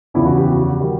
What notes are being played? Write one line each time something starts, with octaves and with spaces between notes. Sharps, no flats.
E2 C#3 F3 E4
F#4
G4
F#4
D#3 G3